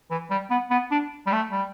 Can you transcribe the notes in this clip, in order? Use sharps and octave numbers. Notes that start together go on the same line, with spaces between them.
E3
G3
B3
B3
D4
G3
A3
G3